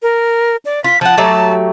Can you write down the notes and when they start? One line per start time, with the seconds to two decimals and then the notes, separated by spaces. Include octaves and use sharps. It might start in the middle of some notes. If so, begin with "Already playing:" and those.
0.02 A#4
0.65 D5
0.84 F4 B6
1.01 F3 F#5 A5
1.17 F#3 A3 G4